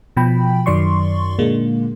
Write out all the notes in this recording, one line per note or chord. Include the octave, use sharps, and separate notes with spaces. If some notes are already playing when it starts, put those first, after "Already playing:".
B2 F3 G5 B5
F#2 D#3 F#3 D5 C6 C#6
A#2 D3 G#3 A#3